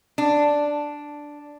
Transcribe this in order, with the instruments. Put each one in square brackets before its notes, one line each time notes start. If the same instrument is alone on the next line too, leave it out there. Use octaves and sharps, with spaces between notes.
[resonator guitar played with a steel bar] D4